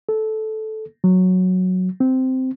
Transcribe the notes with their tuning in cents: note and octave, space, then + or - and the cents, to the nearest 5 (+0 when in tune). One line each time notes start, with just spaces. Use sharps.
A4 -10
F#3 -5
C4 -10